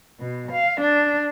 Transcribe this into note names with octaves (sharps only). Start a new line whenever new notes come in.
B2
F5
D4